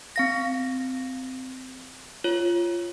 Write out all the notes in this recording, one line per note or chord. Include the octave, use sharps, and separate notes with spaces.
C4 F5 A#6
F4 C#5